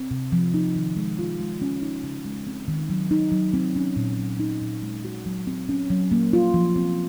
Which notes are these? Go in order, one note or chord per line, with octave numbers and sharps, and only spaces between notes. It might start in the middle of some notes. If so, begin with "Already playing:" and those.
Already playing: C4
C3
F3
D#4
D#3
G#3
F4
G#3
C#4
D#4
C#3
G#3
C4
D#3
F#3
D#4
F#3
C4
C#4
A#2
F#3
D#4
A#2
G#3
F#4
F#3
C4
C#4
F#3
A#3
F4
F3
C4